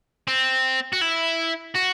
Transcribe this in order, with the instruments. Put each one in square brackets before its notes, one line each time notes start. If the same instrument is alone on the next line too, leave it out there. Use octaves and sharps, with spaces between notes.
[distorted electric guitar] C4
F#4
E4
F#4